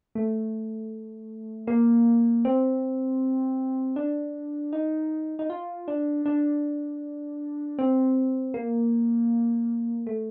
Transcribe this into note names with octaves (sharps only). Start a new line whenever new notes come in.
A3
A#3
C4
D4
D#4
D#4
F4
D4
D4
C4
A#3
A3